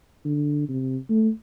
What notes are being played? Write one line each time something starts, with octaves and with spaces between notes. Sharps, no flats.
D3
C3
A3